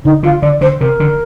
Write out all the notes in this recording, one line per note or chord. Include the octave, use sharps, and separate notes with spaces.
D3 D#4
D3 F4
D3 D5
D3 C5
C3 A#4
D3